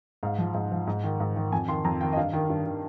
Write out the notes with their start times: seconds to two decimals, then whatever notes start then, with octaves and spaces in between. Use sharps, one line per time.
0.23 G#2 F5
0.38 F3
0.54 G#2
0.72 F3
0.87 G#2
1.04 D#3
1.20 G#2
1.36 D#3
1.52 F2 G#5
1.68 D#3 C6
1.85 F2 A#5
2.01 D#3 G5
2.13 D#5
2.17 G2 F5
2.33 D#3
2.49 G2
2.66 D#3